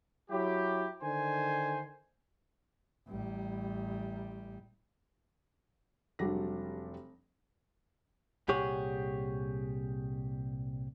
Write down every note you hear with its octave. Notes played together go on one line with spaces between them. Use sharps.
F#3 E4 G4
D3 D#3 C5 G#5
A1 G3
F1 F#3 G3 D4 A#6
C2 A#2 G4 G#4 C#5 F#5